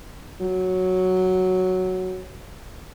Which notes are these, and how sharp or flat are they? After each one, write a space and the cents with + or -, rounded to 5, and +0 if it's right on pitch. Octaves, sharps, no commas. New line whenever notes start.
F#3 +0